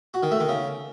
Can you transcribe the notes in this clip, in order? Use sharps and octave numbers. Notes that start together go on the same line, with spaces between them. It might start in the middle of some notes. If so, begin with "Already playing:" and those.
F#4
D#3
A3
D#3
C#3